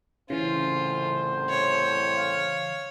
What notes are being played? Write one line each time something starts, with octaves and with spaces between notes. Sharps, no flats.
C2 A2 C#3 E3 C#4 F4 C5
C#5
F5